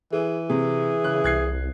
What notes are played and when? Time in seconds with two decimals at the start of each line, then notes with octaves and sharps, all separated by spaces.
0.13 E3 G#4
0.50 C3 G#4
1.04 C#3 F#6
1.24 C2 F#6 G#6 C7